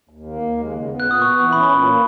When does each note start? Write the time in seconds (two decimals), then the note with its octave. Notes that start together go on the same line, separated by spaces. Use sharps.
0.09 D#2
0.25 A#3
0.42 D#2
0.57 G#3
0.74 C#3
0.89 B3
1.00 F#6
1.05 A#2
1.11 D#6
1.21 B3 C#6
1.37 E3
1.52 C#4 B5
1.69 A#2
1.85 A#3